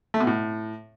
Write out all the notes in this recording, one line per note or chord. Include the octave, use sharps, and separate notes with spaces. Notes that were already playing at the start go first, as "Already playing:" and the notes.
A3
B2
A2